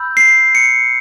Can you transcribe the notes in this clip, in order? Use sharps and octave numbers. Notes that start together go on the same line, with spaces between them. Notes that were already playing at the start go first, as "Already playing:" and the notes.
Already playing: B5 E6 G6
C7
C#7